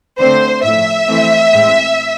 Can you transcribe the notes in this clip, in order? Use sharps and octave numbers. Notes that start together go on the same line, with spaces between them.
D3 A3 C4 C5
A2 F3 A3 E5
E3 A3 C4
A2 G#3 C4